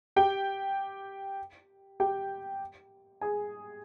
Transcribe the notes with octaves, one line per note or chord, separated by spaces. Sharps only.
G4 G5
G4 G5
G#4 G#5